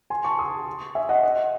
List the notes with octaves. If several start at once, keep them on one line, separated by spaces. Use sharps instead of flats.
G#5 C6
A5 C#6
C6 D#6
E5 G#5
D#5 F#5
D#5